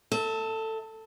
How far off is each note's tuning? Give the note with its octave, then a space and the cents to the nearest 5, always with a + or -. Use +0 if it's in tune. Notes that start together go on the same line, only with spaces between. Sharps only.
A4 +15 E5 -30